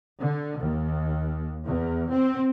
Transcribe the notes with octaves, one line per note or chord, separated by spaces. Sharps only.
D3
D#2
E2
C4